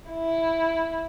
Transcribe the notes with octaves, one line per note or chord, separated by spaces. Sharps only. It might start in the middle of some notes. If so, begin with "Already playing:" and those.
E4